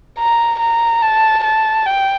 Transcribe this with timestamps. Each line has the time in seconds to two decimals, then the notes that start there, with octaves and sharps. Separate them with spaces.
0.18 A#5
0.59 A#5
1.02 A5
1.44 A5
1.86 G5